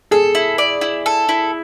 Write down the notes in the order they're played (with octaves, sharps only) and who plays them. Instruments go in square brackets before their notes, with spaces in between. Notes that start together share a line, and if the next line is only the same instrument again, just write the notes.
[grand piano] G#4 [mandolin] A4
[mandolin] E4
D5
E4
A4
E4